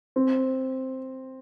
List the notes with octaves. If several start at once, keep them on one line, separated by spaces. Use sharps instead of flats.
C4